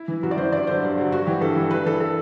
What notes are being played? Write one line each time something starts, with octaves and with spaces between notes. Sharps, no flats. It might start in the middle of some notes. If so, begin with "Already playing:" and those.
Already playing: E4
E3
F#2 F#4
D5
E3 C5
G2 D5
D3 F#3 C5
G2
D3 F#3
G2 F#4
E3 G4
G2 A4
E3
G2 B4
E3 A4
A4